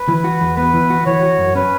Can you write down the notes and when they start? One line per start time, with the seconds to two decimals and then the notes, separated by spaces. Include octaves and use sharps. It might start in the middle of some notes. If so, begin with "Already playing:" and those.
Already playing: B4
0.08 E3
0.24 F#4
0.41 E2
0.57 B3 B4
0.74 E3
0.90 F#4
1.06 E3 C#5
1.23 F#4
1.39 F#2
1.55 C#4 B4